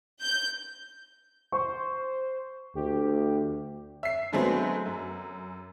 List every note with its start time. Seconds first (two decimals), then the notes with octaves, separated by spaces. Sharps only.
0.21 G6
1.52 C5 C#6
2.75 D2 G4
4.03 E5 C7
4.32 D3 F#3 G#3 A3 B3 C4
4.85 F#2